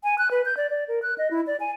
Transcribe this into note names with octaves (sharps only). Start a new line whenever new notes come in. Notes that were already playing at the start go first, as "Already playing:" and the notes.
G#5
F#6
B4
G6
D5
D5
A#4
F#6
D#5
E4
D5
G#5